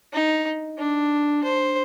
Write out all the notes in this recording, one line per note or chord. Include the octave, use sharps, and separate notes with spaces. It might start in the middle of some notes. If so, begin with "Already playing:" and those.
D#4
D4
C5